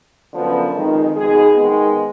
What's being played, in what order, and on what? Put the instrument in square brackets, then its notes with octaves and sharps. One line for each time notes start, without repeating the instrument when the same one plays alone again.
[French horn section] F#2 D3 F3 B3
F2 D#3 G#3
B2 G#3 D#4 G#4
D#3 G#3 B3